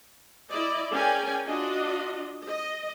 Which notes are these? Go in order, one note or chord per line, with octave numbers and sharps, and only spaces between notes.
E4 D5 D#5
C#4 G#4 A#4 D5 G5 G#5
D4 F4 F#4 D#5
D#5